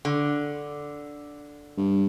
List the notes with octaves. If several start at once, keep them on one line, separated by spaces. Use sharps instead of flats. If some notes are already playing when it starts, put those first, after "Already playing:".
D3
G2